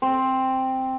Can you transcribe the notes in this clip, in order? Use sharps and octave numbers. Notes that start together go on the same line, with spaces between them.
C4